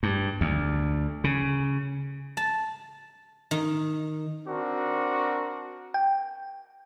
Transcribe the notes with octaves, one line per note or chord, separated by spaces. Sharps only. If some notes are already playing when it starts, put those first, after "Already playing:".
G2
D2
C#3
A5
D#3
C4 D4 F#4 A#4
G5